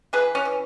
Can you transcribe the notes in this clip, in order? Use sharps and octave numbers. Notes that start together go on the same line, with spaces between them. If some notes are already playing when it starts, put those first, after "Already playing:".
E3 G#4 B4
C#4
E3